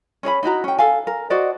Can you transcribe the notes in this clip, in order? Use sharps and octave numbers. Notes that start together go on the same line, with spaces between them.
C#4 G#4 D#5 B5
D#4 E4 F#4 A#5
C#4 G5
A4 F5 G#5
A#4
F#4 C5 D5 D#5